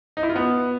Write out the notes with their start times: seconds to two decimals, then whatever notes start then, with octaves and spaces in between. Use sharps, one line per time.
0.17 D#4
0.23 E4
0.29 F4
0.36 B3